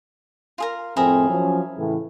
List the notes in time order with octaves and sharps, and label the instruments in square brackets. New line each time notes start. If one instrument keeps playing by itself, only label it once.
[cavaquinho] F4 G#4 A#4
[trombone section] F2 A2 C4 [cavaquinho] E4 G#4 A#4
[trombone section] F3 F#3 C#4
A2 C#3 E3